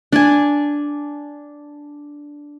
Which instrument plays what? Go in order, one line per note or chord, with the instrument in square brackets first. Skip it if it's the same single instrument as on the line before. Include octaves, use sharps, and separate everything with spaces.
[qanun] D4 G#5